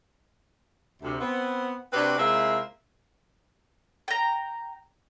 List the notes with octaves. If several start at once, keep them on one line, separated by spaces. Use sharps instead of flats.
D2 C3
B3 C4
C3 C4 D4 F#4 G4 B4
C3 G#3 A#3 E4 F4 E5
G5 A#5